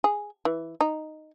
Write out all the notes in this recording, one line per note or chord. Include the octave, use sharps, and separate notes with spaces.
G#4
E3
D#4